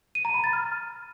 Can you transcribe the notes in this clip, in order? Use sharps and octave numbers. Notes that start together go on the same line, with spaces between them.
D#7
A#5
B5
A6
F6